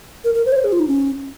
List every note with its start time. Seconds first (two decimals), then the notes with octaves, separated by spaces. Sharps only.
0.24 A#4
0.34 A#4
0.46 C5
0.52 C#5
0.56 C5
0.64 G#4
0.72 F4
0.79 D#4
0.88 C#4